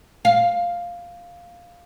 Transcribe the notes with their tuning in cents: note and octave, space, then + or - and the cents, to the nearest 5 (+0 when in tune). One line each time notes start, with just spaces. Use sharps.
F5 +0